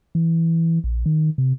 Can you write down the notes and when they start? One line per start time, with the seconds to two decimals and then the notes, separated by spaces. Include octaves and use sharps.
0.15 E3
0.84 A#1
1.06 D#3
1.38 C3